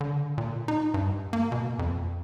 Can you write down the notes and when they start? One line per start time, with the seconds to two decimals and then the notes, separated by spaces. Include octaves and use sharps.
0.01 D3
0.38 A#2
0.68 D#4
0.94 G2
1.33 A#3
1.52 B2
1.79 F2